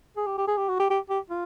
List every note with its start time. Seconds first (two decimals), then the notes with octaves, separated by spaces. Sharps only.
0.17 G#4
0.27 G4
0.38 G4
0.47 G#4
0.58 G4
0.69 F#4
0.80 G4
0.90 G4
1.10 G4
1.30 F4